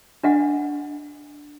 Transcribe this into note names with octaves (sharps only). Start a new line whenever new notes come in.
D4 D#5 F#5